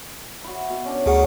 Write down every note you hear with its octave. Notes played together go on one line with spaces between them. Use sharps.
E4 F#4
B2
C#4 D4 D6
D2 A3 C#4 G#4 A#4 F#5